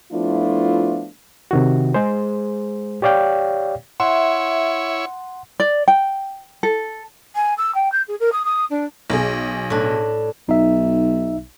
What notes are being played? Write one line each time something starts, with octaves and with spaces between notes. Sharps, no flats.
F3 A3 B3 D4 E4 F4
C3 D#3 F#4
G#3 G#4 C5
G4 C#5 D5 F5 G5
E4 C#5 E5 F#5 C6
D5
G5
A4
G#5
E6
G5
G6
G#4
A#4
D#6
D#6
D4
B1 G#4
A2 D4
B1 D#4 E5